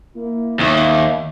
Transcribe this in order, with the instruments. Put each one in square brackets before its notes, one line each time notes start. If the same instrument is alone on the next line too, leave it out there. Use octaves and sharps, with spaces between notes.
[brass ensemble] A#3 E4
[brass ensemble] G1 A2 E5 [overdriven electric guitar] D#2